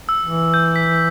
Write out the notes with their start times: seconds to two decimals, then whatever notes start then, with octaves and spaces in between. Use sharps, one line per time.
0.09 E6
0.23 E3
0.54 G6
0.76 B6